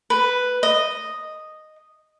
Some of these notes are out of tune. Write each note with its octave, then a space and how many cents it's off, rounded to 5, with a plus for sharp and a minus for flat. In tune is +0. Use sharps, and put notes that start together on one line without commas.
B4 +5
D#5 -5